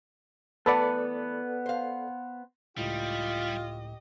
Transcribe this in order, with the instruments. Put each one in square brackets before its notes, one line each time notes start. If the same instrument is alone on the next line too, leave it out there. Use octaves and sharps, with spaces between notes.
[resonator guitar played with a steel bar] E3 A3 F#5 [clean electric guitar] B3 [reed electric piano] A4 B4 D5
[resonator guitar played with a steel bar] C5 F5
[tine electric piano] C#2 A2 [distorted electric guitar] G3 [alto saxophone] F4 [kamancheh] G4 D#5